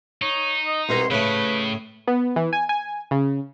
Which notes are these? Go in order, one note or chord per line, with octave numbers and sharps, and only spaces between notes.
D#4 C#5
D#5
C2 B2 A#5 C6
A2 C#3 A3 B4
B3
E3
G#5
G#5
C#3